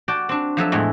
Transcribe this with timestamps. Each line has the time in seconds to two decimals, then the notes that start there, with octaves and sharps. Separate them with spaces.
0.08 F#4 D5 G5 A5
0.29 C4 D4
0.57 F3 F#3 A4 E5
0.72 E2 A2 E3 G#3